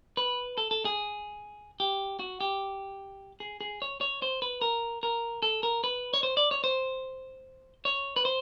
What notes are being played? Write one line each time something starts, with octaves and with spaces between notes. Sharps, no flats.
B4
A4
A4
G#4
G4
F#4
G4
G#4
G#4
C#5
C#5
C5
B4
A#4
A#4
A4
A#4
B4
C#5
C5
D5
C#5
C5
C#5
B4
C5